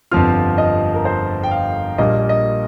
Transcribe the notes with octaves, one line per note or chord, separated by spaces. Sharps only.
G1 F2 F3 C4 F4 F6
D#5
A#4
C5
G5
F5
A#1 A#2 G3 A#3 D#5
D#5